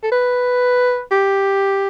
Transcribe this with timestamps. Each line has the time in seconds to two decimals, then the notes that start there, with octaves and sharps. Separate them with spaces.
0.03 A4
0.12 B4
1.11 G4